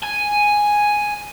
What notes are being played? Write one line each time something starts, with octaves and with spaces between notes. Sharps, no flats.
G#5